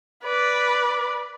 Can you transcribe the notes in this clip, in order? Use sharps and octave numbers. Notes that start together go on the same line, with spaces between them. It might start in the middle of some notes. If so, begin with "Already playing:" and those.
B4 D5